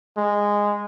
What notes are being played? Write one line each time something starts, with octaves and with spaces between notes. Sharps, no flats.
G#3